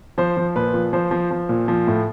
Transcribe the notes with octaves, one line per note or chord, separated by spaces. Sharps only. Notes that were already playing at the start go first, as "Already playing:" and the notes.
F3 C5
F3
A#2 B4
F3
F3 C5
F3
F3
A#2
F3
A2